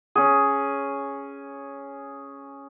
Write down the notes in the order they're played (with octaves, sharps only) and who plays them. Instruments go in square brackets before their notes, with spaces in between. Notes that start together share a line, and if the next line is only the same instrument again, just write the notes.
[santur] C#4 G#4